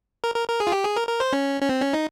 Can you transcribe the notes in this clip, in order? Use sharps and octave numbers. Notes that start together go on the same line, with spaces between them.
A#4
A#4
A#4
G#4
F4
G4
G#4
A#4
A#4
C5
C#4
C#4
C4
C#4
D#4